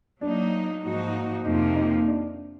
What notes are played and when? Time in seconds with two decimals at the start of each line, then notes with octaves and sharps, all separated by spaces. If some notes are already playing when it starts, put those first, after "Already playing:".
0.21 F#3 A#3 D4 D#4
0.83 G#2 F3 A#3 D#4 F#4
1.45 F2 C3 F3 A#3 D#4
1.76 D#4
2.07 D4